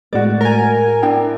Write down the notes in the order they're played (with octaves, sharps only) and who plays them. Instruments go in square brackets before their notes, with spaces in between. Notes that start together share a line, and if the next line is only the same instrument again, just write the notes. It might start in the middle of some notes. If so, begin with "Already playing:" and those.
[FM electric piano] A2 G#3 [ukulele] F#4 D5
[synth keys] A#4 G#5
[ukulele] D4 E4 G5